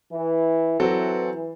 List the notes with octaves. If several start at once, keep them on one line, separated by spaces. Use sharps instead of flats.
E3
E3 F#3 C4 F#4 A4